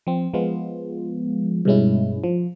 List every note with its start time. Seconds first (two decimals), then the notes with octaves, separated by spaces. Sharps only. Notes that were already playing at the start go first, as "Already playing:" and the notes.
0.07 F3 C4
0.34 F3 G#3 B3 F4
1.65 G2 B2 G#3 C#4 E4
2.24 F3